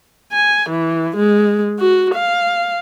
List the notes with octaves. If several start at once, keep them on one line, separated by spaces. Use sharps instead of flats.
G#5
E3
G#3
F#4
F5